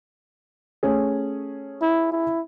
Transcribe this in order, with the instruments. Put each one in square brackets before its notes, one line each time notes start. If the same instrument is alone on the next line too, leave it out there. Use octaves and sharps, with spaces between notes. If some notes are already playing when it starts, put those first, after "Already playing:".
[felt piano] A3 C#4 G#4
[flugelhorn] E4
E4